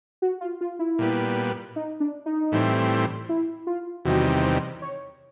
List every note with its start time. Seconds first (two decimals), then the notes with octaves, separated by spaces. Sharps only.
0.22 F#4
0.41 F4
0.61 F4
0.79 E4
0.99 A#2 G3 B3
1.76 D#4
2.00 D4
2.26 D#4
2.52 A2 E3 G3 C4
3.29 E4
3.67 F4
4.05 E2 C3 D#3 G3 F#4
4.43 C5
4.82 C#5